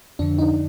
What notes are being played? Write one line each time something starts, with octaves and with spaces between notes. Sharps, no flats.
F2 D3 D4
D#4